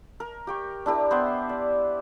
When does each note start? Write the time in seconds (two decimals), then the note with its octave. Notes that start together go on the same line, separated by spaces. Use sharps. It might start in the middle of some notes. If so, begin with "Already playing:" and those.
0.20 A#4
0.47 G4 G5 C#6
0.86 D4 E4 G4 A#4
1.11 B3 C5 E5 C6
1.49 D5